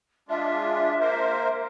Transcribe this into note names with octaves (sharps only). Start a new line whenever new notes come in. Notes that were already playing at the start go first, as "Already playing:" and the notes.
G#3 D4 F4 E5
A#3 A#4 C5